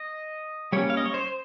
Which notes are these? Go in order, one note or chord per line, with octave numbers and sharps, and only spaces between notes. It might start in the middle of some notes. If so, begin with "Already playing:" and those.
Already playing: D#5
G3 A#3 C#4 C#5
F5
D#5
C#5
C5